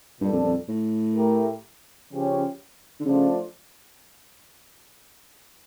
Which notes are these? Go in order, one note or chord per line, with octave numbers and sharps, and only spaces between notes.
G2 A#2 G3 D4 A4
F2
F2
A2
A3 E4 G4 A#4
C#3 F3 C#4 G4
D3
C#3 F3 A3 D4 F4